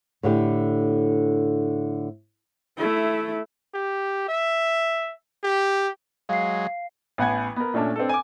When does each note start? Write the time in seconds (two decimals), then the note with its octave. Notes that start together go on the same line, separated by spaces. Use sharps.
0.23 A2 D3 G4
2.77 A3 E4
3.74 G4
4.28 E5
5.43 G4
6.29 F#3 G#3 F5 C7
7.18 A1 B3 F#5 G#5 G#6
7.56 B3 A#4
7.74 A#2 A3 C#4 D4 A5
7.96 C4 D4 A4
8.09 G#5 D6